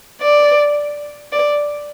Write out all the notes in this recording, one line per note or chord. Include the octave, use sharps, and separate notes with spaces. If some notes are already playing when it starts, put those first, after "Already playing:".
D5
D5